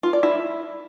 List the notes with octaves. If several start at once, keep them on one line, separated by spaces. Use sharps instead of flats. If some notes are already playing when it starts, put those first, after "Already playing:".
F4
D5
E4